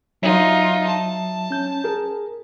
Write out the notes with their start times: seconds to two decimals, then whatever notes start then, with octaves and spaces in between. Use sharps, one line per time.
0.22 F#3 D#4 F4 E5
0.87 A5
1.51 C#4 G6
1.84 G#4 A#4